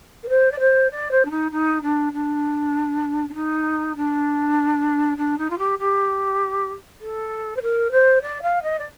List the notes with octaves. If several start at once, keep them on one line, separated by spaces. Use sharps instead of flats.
A#4
C5
D5
C5
D5
C5
D4
D#4
D#4
D4
D4
D4
D#4
D4
D4
D#4
F4
G4
G4
A4
C5
A#4
C5
D5
F5
D#5
D5